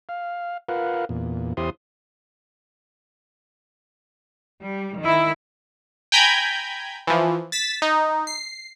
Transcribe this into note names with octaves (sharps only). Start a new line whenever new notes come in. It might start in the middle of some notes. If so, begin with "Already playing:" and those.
F5
F4 A#4 B4 F5 F#5
E2 A#2
E2 E4 G4 C5 C6 D#6
G3
D#3 E4
G5 G#5 A#5 B5 G6 G#6
E3 F3
A6 B6 E7
D#4
C7